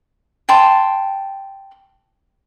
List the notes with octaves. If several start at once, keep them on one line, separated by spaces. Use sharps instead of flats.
G5 A5 C6